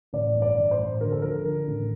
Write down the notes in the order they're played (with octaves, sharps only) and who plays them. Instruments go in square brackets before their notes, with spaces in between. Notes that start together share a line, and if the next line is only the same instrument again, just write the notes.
[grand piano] A1 D5
G2
D5
A1
C5
A1
D3 A#4
A4
F3 A#4
D3
A1